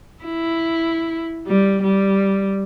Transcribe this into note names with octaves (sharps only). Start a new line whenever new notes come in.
E4
G3
G3